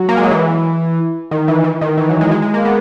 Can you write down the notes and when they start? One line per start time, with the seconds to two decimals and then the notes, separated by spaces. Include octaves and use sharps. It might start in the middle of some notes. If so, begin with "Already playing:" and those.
Already playing: F#3
0.09 A#3
0.17 G#3
0.24 F#3
0.31 E3
1.31 D#3
1.48 E3
1.64 E3
1.81 D#3
1.97 E3
2.09 F#3
2.21 G#3
2.31 G#3
2.42 G#3
2.54 A#3
2.65 B3